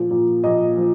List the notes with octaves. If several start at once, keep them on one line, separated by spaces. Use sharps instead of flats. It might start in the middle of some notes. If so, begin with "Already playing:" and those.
Already playing: A#2 F3
A#2 F3
A#2 F3 D#5
F3